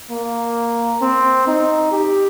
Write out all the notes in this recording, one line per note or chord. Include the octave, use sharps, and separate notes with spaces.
A#3
C4
D#4
G4